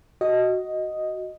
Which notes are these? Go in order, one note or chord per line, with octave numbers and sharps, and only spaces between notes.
F#4 D#5